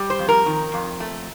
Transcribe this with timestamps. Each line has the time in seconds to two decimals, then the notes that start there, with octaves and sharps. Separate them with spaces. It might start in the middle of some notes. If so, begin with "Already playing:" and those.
Already playing: G3
0.10 C5
0.19 F2
0.28 A#4
0.46 D#3
0.74 F2
1.00 A3